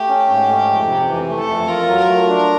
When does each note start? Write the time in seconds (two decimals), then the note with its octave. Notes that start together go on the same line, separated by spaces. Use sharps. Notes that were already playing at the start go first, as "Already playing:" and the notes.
Already playing: A3 G4
0.09 C#4
0.28 G#2
0.48 A3
0.69 F2
0.88 C3
1.08 E3
1.29 A3
1.39 A4
1.48 F2
1.68 F4 A#4
1.87 F#3
1.98 A#4
2.08 A3
2.28 D4